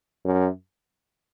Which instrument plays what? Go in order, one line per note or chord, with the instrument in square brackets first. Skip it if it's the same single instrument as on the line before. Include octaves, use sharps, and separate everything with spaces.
[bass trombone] F#2